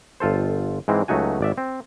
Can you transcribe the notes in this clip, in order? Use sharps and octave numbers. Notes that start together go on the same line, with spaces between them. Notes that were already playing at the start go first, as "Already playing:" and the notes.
G1 F4 A4 C5
G#2 E3 G#3 C4
C#2 F#3 A3 D#4 F#4 G#5
G#1 D5 E5
C4